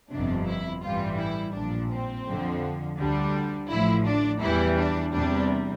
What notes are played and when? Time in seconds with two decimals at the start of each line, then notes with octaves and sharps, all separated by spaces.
0.12 G1 F2 C3 D4
0.47 E4
0.84 A1 G2 E3 G3 F4
1.19 E4
1.56 A#1 A#2 F3 D4
1.91 C4
2.27 F2 D3 F3
2.99 D2 D3 G3 D4
3.71 A1 A2 F3 E4
4.07 D4
4.43 E2 E3 G3 E4
4.78 D4
5.14 E2 C3 G3 D4